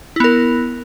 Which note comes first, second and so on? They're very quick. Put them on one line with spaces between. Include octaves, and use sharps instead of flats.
E4 B3 A#4